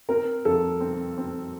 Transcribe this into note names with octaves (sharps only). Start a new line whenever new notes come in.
C4 A#4
F2 A4
C4
C4